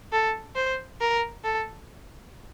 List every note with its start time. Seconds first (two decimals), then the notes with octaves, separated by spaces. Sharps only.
0.12 A4
0.56 C5
1.01 A#4
1.44 A4